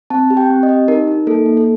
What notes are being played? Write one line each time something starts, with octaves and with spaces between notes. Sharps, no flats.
C4 A5
G4
G5
C4
D#5
G4
D#4 A#4
D#4
A#3 A4
A#3
A4